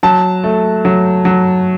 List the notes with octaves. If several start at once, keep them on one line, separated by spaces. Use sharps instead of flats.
F#3 A5
A3
F#3
F#3